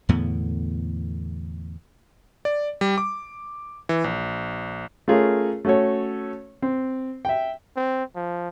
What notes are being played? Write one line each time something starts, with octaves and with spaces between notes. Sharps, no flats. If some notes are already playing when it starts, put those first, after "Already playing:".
E2 A2 D3 B3
D5
G3
D6
E3
A#1
A3 C#4 F4 G#4 A#4
A3 C#4 F#4 A4 C#5
C4
E5 G5
C4
F3